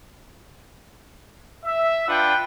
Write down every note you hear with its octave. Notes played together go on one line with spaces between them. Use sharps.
E5
D4 F4 B4 F#5 G5